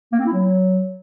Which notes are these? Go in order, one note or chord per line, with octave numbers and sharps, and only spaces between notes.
A#3
C4
E4
F#3